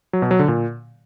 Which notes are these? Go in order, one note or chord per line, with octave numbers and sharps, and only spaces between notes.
F#3
B2
F#3
D3
A#2